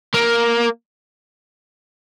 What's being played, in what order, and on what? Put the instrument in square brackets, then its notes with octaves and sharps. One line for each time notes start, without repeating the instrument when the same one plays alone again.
[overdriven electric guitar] A#3